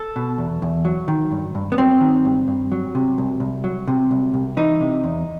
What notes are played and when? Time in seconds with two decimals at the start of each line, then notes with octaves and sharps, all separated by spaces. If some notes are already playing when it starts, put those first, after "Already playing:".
Already playing: A4
0.16 B2
0.38 E2
0.62 E2
0.85 F#3
1.08 D#3
1.31 G2
1.55 G2
1.72 B3
1.78 F#3 C4
2.01 D#3
2.25 G2
2.48 G2
2.72 F#3
2.95 C3
3.18 C2
3.40 C2
3.64 F#3
3.88 C3
4.11 C2
4.34 C2
4.57 E3 D#4
4.80 C3
5.04 E2